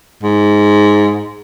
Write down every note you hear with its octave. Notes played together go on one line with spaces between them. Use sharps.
G#2